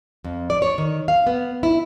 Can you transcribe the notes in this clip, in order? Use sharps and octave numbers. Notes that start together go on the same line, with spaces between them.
F2
D5
C#5
D#3
F5
B3
E4